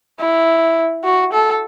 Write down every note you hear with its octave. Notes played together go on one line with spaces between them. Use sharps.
E4
F#4
A4